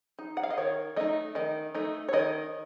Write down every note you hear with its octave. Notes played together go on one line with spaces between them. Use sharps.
D#4
F#5
F5
D#5
D#3 C#5
A3 D#4 D#5
D#3 D#5
A3 D#4
C#5
D#3 D#5